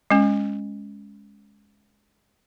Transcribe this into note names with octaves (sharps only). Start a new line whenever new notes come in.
G#3 C#4